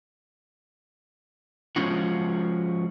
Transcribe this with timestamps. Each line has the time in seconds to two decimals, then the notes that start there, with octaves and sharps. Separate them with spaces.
1.76 F3 G#3 C#4 F4 F#4